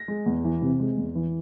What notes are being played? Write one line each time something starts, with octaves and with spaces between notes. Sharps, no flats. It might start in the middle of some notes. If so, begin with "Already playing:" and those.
Already playing: A#6
G#3
E2
E3
C3
G#3
E2
E3